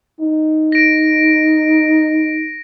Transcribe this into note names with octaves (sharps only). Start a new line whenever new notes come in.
D#4
A#6 D7